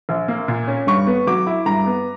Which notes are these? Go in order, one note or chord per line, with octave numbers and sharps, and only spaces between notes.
A#1
A#3
A#2
C#4
G2 C#6
B3
F#3 D6
E4
G2 A#5
B3